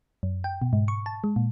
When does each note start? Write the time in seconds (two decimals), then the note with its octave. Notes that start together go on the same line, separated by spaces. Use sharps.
0.23 F#2
0.44 G5
0.62 B2
0.73 G#2
0.88 C#6
1.06 A5
1.24 G#3
1.36 A#2